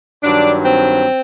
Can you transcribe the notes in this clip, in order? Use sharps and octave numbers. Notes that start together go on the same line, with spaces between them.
G2 D#3 F#3 D4
C4